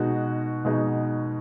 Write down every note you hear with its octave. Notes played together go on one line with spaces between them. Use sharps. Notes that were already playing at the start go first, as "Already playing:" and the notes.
Already playing: B2 G#3 D#4 F#4
B2 G#3 D#4 F#4